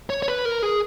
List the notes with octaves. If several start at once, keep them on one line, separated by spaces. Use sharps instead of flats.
C#5
C#5
B4
A#4
G#4